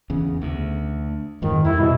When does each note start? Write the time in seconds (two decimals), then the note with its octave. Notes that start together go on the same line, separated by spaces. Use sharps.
0.10 E2 C#3
0.41 D2
1.42 F2 G#2 D#3 F3
1.65 F2 G#2 G3 E4
1.80 B2